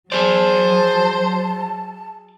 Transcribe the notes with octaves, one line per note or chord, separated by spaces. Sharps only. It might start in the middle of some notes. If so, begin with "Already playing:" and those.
F#3 G#4 C5 D5 A5